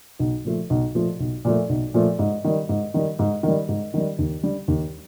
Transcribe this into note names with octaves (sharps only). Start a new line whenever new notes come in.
B1
A#2 F3 A3
B1
A#2 F3 A3
B1
A#2 F3 A3
B1
A#2 F3 A3
G#2
D#3 G3
G#2
D#3 G3
G#2
D#3 G3
G#2
D#3 G3
D#2
D3 G3
D#2